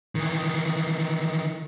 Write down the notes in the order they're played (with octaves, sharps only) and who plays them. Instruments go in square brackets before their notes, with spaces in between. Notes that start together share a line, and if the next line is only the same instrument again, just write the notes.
[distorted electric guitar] D#3 E3